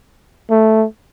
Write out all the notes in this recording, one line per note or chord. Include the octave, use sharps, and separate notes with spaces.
A3